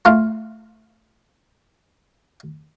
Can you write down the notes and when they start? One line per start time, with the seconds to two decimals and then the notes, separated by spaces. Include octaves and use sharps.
0.05 A3 F4 F5